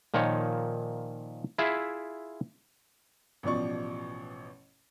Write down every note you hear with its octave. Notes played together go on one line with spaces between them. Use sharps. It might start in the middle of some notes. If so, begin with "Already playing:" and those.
A#2 D#3 F3 D#4 C#5
E4 F4 G#4 E5
A1 B2 F3 D5 C#6